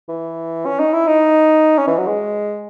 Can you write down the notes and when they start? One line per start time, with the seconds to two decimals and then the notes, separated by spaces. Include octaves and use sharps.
0.09 E3
0.66 C#4
0.79 D#4
0.93 E4
1.07 D#4
1.78 C#4
1.87 E3
1.98 F#3
2.07 G#3